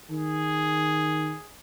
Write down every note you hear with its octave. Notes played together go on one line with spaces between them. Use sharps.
D#3 G#4